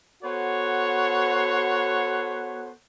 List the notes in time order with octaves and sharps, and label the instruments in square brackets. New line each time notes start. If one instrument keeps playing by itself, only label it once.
[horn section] B3 F#4 A4 C5 C#5 F#5